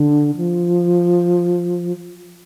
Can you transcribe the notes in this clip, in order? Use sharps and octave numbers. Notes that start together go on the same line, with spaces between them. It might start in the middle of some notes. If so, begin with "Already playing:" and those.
Already playing: D3
F3